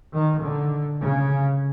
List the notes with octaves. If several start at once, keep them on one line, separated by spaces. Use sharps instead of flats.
D#3
D3
C#3